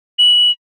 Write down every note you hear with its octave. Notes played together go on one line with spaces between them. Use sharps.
F#7